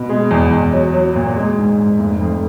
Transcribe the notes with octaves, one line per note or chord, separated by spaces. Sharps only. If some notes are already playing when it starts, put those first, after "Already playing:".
Already playing: B2
G#3
E2
E2
F#3
F#3
A#2
G#3
G#2
G#2
F1
F2